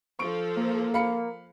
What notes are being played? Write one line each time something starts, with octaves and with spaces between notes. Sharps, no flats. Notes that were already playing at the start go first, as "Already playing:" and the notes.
F3 A4 C#6 D7
A#3
F5 B5 C#7